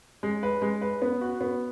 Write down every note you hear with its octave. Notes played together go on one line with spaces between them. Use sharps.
G#3
B4
G#3
B4
B3
F#4
B3